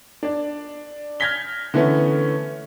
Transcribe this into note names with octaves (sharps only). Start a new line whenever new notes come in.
D4 D5
F6 G6 G#6 A#6 B6 G7
D3 E3 A3 B3 C#4